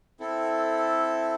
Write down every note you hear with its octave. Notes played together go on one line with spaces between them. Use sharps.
C4 E4 A4